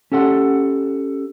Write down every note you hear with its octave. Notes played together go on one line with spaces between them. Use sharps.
C#4 G4 A4 F#5 C6